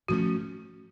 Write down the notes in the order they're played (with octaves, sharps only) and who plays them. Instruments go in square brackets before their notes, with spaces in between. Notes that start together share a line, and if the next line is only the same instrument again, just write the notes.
[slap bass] G#2 F3 A3 C#4 [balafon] F#4